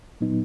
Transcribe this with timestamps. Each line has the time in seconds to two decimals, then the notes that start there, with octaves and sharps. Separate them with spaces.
0.21 A#2 F#3 B3 D#4